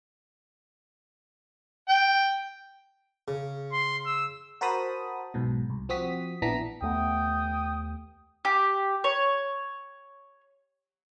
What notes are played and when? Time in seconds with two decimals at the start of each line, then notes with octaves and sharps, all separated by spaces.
1.89 G5
3.28 C#3
3.72 C6
4.06 E6
4.61 F#4 A#4 C5 A5 B5 D#6
5.34 B1 G#2 B2
5.70 C2
5.89 F3 C4 F#4 D#6 B6
6.42 A#1 E3 B3 D4 A#5 B6
6.82 D#2 A3 B3 G5 D#6
8.45 G4
9.04 C#5